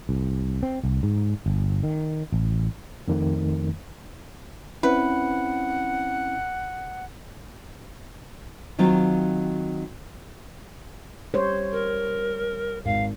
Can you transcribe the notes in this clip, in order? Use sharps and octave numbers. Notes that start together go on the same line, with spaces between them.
C2
C4
C2
G#2
G1
D#3
A1
F2 D#3 A3
C4 C#4 E4 B4 F#5
D#3 F#3 C4 F4
G3 C5 C#5
A#4
G#1 F5